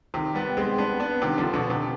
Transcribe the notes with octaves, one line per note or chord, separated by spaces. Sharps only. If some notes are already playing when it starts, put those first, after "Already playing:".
C3 D#3
G3 B3
G#3 C4
B3 D4
B3 D4
C3 D#3
D3 F3
B2 D3
C3